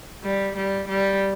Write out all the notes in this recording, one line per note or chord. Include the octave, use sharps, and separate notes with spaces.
G3
G3
G3